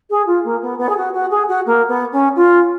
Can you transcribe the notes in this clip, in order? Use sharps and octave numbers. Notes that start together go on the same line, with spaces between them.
G#4
F4
A#3
B3
B3
G#4
F#4
F#4
G#4
F#4
A#3
B3
C#4
F4